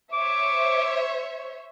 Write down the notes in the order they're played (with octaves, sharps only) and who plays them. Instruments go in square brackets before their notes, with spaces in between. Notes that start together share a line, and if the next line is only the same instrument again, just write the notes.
[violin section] C5 C#5 E5 [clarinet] D6